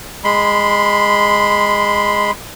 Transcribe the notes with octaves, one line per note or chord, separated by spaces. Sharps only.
G#3 B5 C6